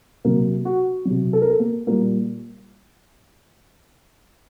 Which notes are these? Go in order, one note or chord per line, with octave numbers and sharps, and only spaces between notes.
C3 F#3 A#3
F#4
C3 F#3
A4
A#4
A4
A#3
A#2 G3 A#3